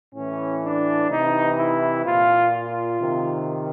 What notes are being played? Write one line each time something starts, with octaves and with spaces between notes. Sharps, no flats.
A2 E3 C#4
D4
C3 E3 D#4
E4
A#2 F4
F4
C3 D#3